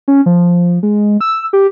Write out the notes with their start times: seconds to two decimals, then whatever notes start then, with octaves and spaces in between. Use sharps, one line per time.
0.08 C#4
0.26 F3
0.83 G#3
1.21 E6
1.53 G4